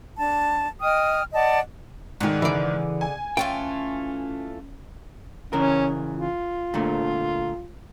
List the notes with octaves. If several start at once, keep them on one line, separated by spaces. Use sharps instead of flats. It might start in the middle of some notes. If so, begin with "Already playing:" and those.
D4 A5
D#5 G5 D#6 F6
D5 D#5 F#5 A5
G#2 D3 D#3 G#4
C#3 E3 D5
G#5
E3 A3 C#4 F4 G5
C#3 E3 C#4 A#4
F4
A#2 D3 A3